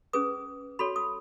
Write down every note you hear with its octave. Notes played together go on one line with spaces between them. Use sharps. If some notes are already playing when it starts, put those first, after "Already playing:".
C#4 G#4 B4 D#6
F#4 A4 C#5 B5
D#6